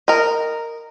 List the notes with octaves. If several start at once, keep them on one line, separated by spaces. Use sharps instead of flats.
A#4 D#5